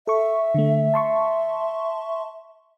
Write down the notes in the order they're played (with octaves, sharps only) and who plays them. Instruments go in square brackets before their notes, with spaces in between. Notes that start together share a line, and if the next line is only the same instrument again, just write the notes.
[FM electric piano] A4 C#6 [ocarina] E5
[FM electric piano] D3 A3
A5 C6 C#6